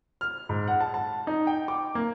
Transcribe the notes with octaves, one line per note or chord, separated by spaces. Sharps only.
F6
G#2
F#5
A5
A5
D#4
G5
D6
A#3